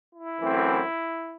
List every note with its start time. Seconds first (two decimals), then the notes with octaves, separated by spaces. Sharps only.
0.11 E4
0.41 F#2 E3 A3 C4